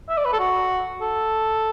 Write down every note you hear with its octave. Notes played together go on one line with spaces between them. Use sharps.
E5
D5
B4
A4
F#4
A4